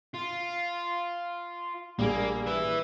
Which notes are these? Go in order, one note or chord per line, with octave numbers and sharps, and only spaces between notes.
F4
A#1 G3 A#3 G#4
B4 E5